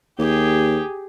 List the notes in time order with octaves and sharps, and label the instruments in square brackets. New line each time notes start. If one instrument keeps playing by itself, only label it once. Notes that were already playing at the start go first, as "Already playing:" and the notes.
[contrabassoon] D#2 [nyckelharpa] G4 G#4